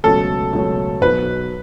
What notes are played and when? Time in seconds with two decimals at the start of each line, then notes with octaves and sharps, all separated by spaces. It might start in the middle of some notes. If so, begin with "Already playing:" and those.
0.03 C#2 B2 F#3 A3 C#4 A4
0.53 C#2 B2 F#3 A3 C#4
1.02 B1 B2 F#3 B4